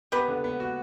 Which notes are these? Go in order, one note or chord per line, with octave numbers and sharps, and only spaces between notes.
B3 G4 B4
D3
B3
F#4